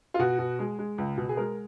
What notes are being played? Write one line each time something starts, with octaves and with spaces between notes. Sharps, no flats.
F4
B2 F#4
B2
G#3
G#3
C#2
B2
G#4
G#3 A#4